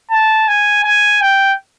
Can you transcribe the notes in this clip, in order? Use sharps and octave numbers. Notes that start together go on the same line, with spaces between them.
A5
G#5
G#5
G5